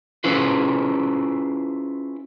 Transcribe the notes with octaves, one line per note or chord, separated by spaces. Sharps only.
C#4 E4 F4 G#4 B4 C5